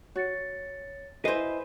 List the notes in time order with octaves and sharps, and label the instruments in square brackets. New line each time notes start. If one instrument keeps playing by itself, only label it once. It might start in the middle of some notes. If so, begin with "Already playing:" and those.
[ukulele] F#4 [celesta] C#5 A6 C#7
[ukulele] E4 D#5 [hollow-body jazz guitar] B4 C5 [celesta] G#5 C7